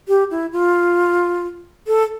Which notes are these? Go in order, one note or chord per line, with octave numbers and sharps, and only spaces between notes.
G4
E4
F4
A4